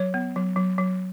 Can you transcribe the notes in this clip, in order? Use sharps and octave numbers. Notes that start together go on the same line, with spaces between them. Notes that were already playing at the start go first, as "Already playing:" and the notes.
Already playing: F#3 C#5
B3
F#3
F#3
F#3